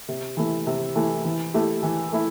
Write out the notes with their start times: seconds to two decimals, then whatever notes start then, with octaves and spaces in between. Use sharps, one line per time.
0.08 C3
0.37 E3 A3 E4
0.67 C3
0.95 E3 A3 E4
1.25 E3
1.54 A3 E4 G4
1.83 E3
2.12 A3 E4